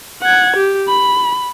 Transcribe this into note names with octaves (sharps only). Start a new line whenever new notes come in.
F#5 G#6
G4
B5